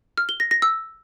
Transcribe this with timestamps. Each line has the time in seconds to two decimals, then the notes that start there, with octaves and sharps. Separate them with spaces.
0.18 F6
0.29 G7
0.40 A#6
0.51 A#6
0.62 E6